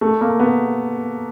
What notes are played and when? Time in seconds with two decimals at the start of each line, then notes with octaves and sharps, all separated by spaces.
0.01 A3
0.21 A#3
0.40 B3